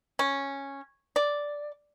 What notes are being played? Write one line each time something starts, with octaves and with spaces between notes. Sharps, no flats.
C#4
D5